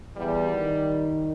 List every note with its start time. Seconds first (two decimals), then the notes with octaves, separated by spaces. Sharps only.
0.16 E2 G3
0.51 D#3